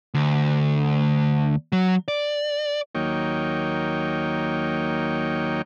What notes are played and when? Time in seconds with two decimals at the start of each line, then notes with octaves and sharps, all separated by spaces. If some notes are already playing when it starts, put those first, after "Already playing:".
0.14 D2
1.72 F#3
2.08 D5
2.95 D#2 F#3 A#3 D#4 C#5 G5